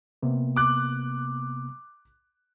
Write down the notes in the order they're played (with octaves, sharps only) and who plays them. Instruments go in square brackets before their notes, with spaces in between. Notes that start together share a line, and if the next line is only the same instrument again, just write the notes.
[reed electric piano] C3 A#3 B3
[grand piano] D6 F#6